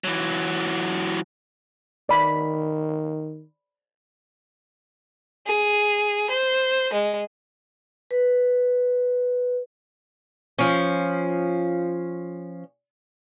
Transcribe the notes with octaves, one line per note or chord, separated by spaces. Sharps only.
E3 F#3
D#3 D5 B5
G#4
C5
G#3
B4
F3 C#4